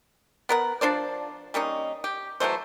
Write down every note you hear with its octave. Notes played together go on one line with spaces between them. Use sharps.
B3 A#4 F#5
F3 D4 C5 D5
G3 A#3 C#4 D#4
G4
E3 F#3 A3 C5